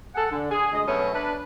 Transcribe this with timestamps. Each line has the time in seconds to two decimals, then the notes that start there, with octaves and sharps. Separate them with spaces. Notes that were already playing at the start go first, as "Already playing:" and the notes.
0.15 G#4 A4 F#5
0.31 D3
0.51 G#4
0.72 D2 G#3 D#5
0.87 B2 F#3 A3 C#4
1.14 D4 B4